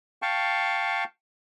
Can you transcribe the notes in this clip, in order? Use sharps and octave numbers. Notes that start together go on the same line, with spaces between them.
F5 G5 A5 C#6